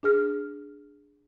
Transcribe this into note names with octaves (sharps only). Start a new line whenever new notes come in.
D4 G#4 F6